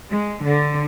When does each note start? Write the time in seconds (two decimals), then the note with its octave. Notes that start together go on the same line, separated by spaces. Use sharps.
0.10 G#3
0.44 D3